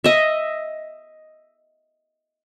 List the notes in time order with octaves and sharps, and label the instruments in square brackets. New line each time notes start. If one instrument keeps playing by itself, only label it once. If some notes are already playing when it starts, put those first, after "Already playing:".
[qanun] D#5 E5